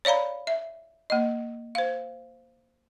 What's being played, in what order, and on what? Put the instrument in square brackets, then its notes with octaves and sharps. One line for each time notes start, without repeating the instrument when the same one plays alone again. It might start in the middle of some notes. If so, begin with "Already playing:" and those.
[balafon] C#5 D5 F5 A#5 B5
E5
A#3 D#5
C5 F5